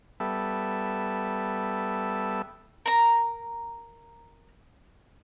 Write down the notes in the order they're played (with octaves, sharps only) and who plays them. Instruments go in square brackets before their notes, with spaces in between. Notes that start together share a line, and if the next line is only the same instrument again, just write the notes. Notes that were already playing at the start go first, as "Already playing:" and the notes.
[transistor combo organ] G3 B3 A4 E5
[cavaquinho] A#4 A#5